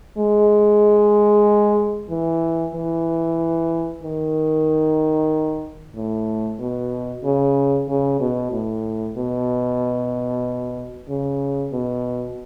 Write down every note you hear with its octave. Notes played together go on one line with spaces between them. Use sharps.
G#3
E3
E3
D#3
A2
B2
C#3
C#3
B2
A2
B2
C#3
B2